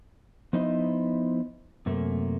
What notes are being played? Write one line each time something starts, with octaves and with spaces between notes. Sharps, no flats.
F3 B3 D#4 E4 C5 D#5
F#2 C3 A3 A#3